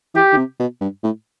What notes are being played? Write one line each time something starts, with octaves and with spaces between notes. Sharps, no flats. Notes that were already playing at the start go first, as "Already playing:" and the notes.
E3 G4
D#3
C3
B2
G2
A2